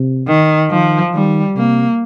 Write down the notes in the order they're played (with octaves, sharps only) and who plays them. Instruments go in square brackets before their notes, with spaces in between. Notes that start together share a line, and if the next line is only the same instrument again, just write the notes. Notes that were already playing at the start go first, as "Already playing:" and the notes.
Already playing: [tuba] C3
[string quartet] D#3
[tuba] D#3 [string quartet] F3
[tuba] D#3 [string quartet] G3
[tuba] C3 [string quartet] A#3